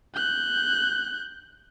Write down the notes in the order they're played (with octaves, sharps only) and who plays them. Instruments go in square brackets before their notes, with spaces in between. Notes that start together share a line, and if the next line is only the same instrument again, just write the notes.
[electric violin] F#6 G6